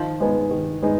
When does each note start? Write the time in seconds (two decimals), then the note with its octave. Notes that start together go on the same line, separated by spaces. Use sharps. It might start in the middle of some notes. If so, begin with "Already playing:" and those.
Already playing: D#3 F3
0.20 G#3 B3 D#4
0.51 D#3
0.82 G#3 B3 D#4